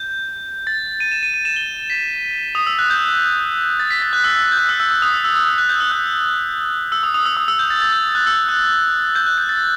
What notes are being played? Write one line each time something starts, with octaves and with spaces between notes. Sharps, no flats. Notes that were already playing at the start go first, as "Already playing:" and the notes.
Already playing: G6
A6
D#7
E7
D#7
D#7
E7
G7
B6
D#6
E6
F#6
G6
A6
B6
A6
F#6
E6
E6
G6
F#6
E6
E6
E6
D#6
E6
E6
E6
E6
F#6
G6
E6
F#6
E6
D#6
D#6
E6
D#6
E6
G6
A6
A6
G6
F#6
E6
F#6
G6
F#6
G6
A6